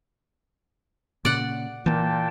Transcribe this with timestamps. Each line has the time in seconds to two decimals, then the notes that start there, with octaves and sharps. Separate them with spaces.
1.25 A#2 C#3 D5 F#5
1.86 A#2 E3 A#3 G5 A5